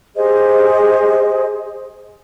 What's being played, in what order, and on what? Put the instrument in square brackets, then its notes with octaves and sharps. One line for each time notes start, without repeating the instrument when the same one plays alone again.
[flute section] G4 G#4 C5 D#5